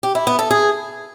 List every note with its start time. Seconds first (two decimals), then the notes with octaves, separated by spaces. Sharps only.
0.03 G4
0.15 E4
0.27 B3
0.39 A4
0.50 G#4